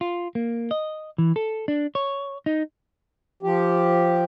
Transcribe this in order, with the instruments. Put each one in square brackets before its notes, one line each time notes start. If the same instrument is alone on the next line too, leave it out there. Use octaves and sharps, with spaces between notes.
[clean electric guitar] F4
A#3
D#5
E3
A4
D4
C#5
D#4
[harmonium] F3 G4